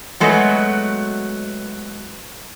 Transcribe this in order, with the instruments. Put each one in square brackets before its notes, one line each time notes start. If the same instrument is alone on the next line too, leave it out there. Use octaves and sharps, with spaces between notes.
[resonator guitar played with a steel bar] F#3 G#3 A3 B3 F#4 D#5